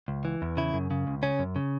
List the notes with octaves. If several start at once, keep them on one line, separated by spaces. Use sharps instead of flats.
C#2
E3
E2
C#3 E4
F#2
C#3
C#2
C#3 C#4
F#2
C#3